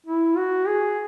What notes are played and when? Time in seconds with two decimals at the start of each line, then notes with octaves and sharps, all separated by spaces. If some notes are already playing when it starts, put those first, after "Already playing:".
0.06 E4
0.37 F#4
0.67 G#4